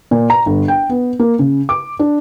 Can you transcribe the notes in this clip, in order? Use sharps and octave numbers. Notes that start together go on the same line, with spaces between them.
A#2
A#5
G1
G5
B3
A#3
C#3
D6
D4